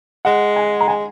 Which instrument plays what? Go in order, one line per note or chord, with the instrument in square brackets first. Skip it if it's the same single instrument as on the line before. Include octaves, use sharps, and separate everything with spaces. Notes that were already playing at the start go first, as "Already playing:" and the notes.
[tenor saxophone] G#3 [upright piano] F#5
[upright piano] G#5
A#5
[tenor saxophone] G#3 [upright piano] G#5